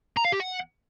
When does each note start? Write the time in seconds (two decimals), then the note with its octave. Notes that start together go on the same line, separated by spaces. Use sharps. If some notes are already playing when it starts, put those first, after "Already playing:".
0.17 A#5
0.25 F5
0.32 G4
0.40 F#5